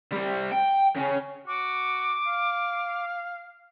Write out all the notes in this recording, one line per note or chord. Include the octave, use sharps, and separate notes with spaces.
G3 C4
G5
C#3 C#4
F#4 D6
F5